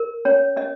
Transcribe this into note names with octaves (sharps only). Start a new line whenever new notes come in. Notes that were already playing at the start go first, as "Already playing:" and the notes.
Already playing: A#4
C#4 C#5
C#4 D#5